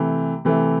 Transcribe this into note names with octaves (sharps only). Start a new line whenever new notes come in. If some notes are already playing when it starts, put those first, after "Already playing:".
Already playing: C3 E3 A3
C3 E3 A3